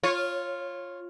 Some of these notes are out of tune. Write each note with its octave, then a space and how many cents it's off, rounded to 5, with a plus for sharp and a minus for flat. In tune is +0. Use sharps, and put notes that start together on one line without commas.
F4 +0 C#5 -20